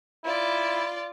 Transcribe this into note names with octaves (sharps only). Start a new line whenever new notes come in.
E4 F4 D5